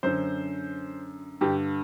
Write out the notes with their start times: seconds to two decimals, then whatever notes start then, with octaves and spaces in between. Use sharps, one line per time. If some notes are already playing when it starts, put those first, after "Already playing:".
0.03 F#2 D3 C5
1.41 G2 D3 G4